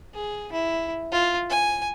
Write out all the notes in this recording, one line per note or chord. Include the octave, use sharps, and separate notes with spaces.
G#4
E4
F4
G#5